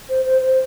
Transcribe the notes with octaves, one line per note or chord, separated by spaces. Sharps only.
C5
C5
C5